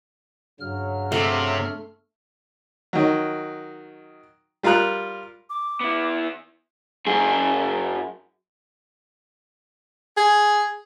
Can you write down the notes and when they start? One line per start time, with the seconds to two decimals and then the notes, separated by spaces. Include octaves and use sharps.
0.61 G2 C#3 F#3 F6
1.12 C3 A3
2.93 D#3 F#3
4.63 G3 F4 A#4 A#5 F#6
5.50 D6
5.80 B3 E4
7.07 F#2 G#4
10.17 G#4